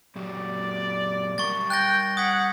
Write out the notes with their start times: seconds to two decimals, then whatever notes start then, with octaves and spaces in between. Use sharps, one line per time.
0.16 A#2 F#3 G4 D5
1.38 G3 A#4 C#6 A6
1.70 G5 F#6 G6 A#6
2.17 F#5 D#6 G#6 B6